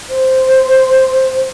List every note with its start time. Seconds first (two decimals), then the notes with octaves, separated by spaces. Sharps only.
0.09 C5